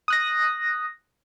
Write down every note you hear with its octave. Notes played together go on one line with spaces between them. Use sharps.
D#6 F#6 A#6